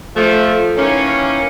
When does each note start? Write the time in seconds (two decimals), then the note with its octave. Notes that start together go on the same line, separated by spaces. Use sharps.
0.16 F3 A3
0.77 D#3 E3 A#3 C#4